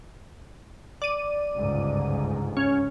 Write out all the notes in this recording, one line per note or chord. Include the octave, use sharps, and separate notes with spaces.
D5 D#7
G1 C#2 G#2
C#4